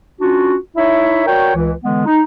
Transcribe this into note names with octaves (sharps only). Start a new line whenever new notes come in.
C#4 D4 F4 F#4
D#4 E4 C#5 E5
F#4 A#4 C#5 D5 G5
C#2 E3
D3 E3 G#3 B3
D#4